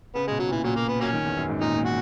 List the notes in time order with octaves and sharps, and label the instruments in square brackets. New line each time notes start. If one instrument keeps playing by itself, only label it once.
[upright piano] C#3 [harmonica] B3
[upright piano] B2 [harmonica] G#3
[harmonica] F#3
[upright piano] A#2 [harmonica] E3
[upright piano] A#2 [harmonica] F#3
[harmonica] A#3
B3
F#3 A#3 C#4
[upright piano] D#3
E2
F#2
G#2
[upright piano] A#2 [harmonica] D#4
[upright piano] A#2
[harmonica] F#4